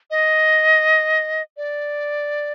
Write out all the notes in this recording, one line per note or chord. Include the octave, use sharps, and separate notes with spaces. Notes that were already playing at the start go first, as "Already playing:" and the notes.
D#5
D5